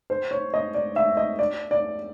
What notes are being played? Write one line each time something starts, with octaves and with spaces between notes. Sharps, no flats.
C5
C#5
D#5
D5
E5
D#5
D5
D5